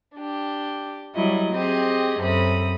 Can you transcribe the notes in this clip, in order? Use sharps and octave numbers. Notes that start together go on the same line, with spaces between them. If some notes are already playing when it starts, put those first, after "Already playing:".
D4 G4
F#3 G3 E4 D#5
C4 G4 G#4 D#5
F#2 C3 A4 B5 D#6